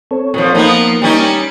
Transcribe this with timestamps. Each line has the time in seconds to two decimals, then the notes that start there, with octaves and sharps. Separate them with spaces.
0.11 C4 A4 C#5
0.34 A#2 F3
0.55 F3 A#3 B3 D#4
1.02 G3 C#4 D#4